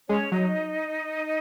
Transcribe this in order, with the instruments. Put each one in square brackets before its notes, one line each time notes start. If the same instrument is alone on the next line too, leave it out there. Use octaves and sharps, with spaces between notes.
[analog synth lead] G#3 [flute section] C#4 C#5
[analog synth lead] F#3 [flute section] D#4 D#5